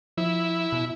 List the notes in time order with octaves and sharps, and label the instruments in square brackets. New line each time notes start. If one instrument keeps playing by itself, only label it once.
[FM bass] F3 [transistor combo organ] E4
[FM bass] B2